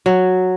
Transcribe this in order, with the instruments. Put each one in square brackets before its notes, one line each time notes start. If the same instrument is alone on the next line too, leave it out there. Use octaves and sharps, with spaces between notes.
[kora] F#3